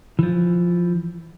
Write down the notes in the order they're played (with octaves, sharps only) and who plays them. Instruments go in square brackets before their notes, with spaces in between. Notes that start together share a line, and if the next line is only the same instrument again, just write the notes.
[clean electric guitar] E3 F3